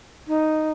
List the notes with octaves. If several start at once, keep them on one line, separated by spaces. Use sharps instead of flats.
D#4